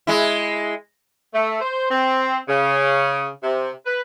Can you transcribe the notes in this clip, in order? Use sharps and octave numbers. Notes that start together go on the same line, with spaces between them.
G#3 E4
A3
C5
C4
C#3
C3
B4